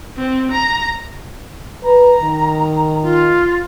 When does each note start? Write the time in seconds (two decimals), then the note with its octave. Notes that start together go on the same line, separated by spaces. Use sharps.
0.17 C4
0.52 A#5
1.83 B4 A#5
2.21 D#3
3.02 F4